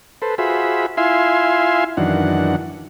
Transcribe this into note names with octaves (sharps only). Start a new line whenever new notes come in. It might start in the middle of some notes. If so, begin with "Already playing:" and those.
A4 B4 C5
F4 F#4 G#4 C5 E5 B5
E4 F4 E5 F5 G#5 C6
F#2 D#3 E3 D4 F#5